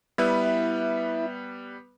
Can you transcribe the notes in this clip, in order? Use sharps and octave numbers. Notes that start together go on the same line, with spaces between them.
G3 B3 E4 B4 E5